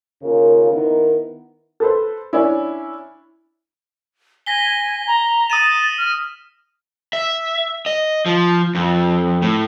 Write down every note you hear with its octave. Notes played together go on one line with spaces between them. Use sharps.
D#2 C#3 F4 A#4
D#3 B3 D#4 E4 A#4
A4 B4 C5
C#4 D4 E4
G#5 A#6 B6 G7
A#5
D#6 A6 D#7 E7
F6
E5
D#5
F3
F2
A2